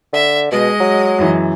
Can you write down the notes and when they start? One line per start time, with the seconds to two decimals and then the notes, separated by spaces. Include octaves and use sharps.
0.13 D3 E5
0.51 B2 G#3 D#5
0.80 F#3
1.19 F#2 E3